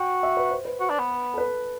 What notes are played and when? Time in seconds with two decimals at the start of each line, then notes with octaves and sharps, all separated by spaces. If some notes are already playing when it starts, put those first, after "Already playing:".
Already playing: F#4 G5
0.23 E5
0.37 B4
0.51 C5
0.65 B4
0.80 F#4
0.90 D4
0.99 B3
1.34 A4
1.38 B4